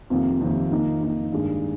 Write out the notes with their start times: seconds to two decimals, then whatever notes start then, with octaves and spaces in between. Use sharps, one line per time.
0.10 F2 C3 D#3 A#3 F4
0.40 F2 C3 D#3 A#3 F4
0.71 D#3 A#3 D#4
1.01 D#3 A#3 D#4
1.32 G2 D#3 G#3